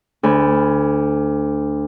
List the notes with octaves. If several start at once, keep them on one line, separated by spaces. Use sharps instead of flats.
D2 G#5 B5